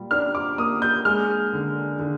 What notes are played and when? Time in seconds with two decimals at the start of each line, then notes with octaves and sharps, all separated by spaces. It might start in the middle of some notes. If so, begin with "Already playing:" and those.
Already playing: A#2 G3
0.11 D4 F6
0.35 D6
0.58 A#3 D#6
0.82 G6
1.05 G#3 F6
1.53 D3
1.99 D3